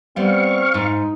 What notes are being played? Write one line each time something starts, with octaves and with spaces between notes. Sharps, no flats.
G3 B3 C4 F5 C#6
G#2 D#4